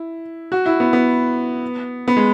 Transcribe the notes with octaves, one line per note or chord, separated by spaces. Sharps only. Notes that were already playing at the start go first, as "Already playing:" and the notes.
Already playing: E4
F#4
E4
B3
B3
B3
G#3